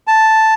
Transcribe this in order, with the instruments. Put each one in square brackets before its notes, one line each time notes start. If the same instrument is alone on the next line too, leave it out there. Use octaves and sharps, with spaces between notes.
[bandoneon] A5